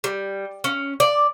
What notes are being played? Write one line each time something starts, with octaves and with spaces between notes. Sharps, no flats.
G3
C#4
D5